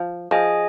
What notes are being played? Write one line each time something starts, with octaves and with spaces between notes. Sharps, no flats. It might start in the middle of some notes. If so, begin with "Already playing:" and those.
Already playing: F3
F3 G#4 D#5 G#5